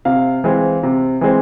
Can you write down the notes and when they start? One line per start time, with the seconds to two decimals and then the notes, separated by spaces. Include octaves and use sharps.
0.05 C3 F5
0.44 E3 G#3 C4
0.83 C3
1.21 E3 G#3 C4